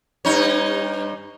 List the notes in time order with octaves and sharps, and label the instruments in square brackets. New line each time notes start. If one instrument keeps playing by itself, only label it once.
[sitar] G2 D#4 C#5